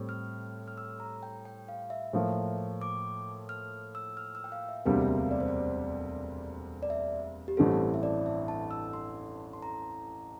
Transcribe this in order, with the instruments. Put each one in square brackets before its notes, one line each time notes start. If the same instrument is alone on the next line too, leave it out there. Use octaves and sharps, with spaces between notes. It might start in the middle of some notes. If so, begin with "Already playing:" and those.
Already playing: [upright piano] A2 G3 C4
[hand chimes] F6
F6
E6
A#5
G5
G5
F5
E5
[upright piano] A2 F3 A#3
[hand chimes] D6
F6
E6
F6
E6
G5
F5
E5
[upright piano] E1 D2 C3 G3 A#3 [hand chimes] G5
[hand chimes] E5
F5
D5
C5
D5
D5
E5
G4
[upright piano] A1 G2 E3 A3 C4 [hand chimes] A4
[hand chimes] E5
D5
E5
A5
E6
C6
C6
A#5